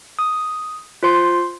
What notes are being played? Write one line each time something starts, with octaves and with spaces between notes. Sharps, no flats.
D#6
F4 C5 C6